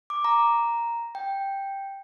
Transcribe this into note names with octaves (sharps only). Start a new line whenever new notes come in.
D6
A#5
G5